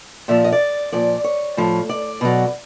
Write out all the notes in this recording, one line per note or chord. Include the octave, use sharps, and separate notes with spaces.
A#2 F3 E5
D#5
D5
A#2 F3 D5
C#5
A2 F3
D5
B2 F#3